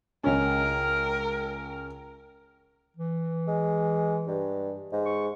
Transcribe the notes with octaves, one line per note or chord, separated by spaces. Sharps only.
C#2 C#4 A#4
E3
G#3
G2
G#2
C#6